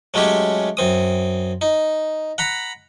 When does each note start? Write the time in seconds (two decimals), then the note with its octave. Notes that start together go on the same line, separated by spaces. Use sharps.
0.14 F#3 G#3 A3 C#4 G4
0.77 F#2 C4 D#6
1.61 D#4
2.38 F#5 A#5 B5